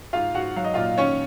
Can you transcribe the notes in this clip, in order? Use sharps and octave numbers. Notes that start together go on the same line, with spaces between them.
G#2 F4 F5
G#2 F#4 F#5
F#3 F5
D#5
A#2 F4 F5
D#3 C#4 C#5